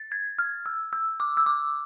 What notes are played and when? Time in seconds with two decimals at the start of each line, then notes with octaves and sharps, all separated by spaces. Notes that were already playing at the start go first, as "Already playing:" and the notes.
Already playing: A6
0.12 G#6
0.39 F6
0.66 E6
0.93 E6
1.20 D6
1.37 E6
1.46 D6